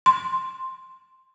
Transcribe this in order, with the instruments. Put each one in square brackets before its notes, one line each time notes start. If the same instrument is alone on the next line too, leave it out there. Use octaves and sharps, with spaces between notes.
[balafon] C6